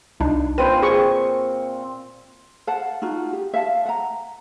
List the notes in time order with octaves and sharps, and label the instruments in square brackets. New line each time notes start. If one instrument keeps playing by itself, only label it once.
[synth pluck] C2 D4 D#4
[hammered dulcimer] A#2 C4 G5 [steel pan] B4 C5 [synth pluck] D#7
[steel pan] G#4 C#6
[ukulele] F5 F#5 A5
D#4 F4 F#4
G4
E5 F5 A5
F#5 A#5